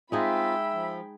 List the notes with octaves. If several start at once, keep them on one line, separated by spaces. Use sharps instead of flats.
G#3 C4 D#4 F4 G#4 E5 G5 B5
F3